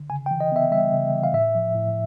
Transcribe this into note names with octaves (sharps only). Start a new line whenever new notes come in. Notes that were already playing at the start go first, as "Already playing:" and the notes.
Already playing: D3
C#3 G#5
G5
E3
D#5
B3 E5
G3 E5
C#3
E3
F5
A2 E5
F3
A2